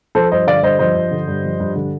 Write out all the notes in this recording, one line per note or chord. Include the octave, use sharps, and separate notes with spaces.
F3 A4 C5
G2 C5 D#5
D3 D5 F5
G2 C5 D#5
F3 C5 D#5
G2
D3
G2
F3
G2
D3